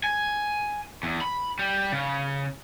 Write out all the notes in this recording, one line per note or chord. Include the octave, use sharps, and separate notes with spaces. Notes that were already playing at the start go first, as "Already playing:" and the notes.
G#5
E2
B5
G3
C#3